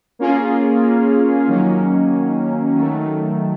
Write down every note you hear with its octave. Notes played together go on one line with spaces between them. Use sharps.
A#3 C#4 F4 G#4
D#3 F#3 A#3 C#4
D#3 F#3 A3